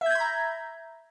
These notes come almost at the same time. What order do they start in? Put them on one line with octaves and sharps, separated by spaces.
E5 G6 G#6 B5 A#5